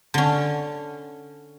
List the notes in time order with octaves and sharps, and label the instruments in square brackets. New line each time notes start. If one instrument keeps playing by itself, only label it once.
[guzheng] D3 C#4